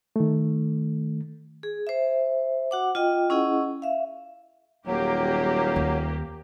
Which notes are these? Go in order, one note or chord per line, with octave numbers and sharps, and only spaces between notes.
D#3 A3
G#4
C5 E5
F#4 F#5 D6
F4 D#5 G5
C#4 E4 G#4 D#5 F#5
E5 F5
D#1 F#3 A#3 G4
D#2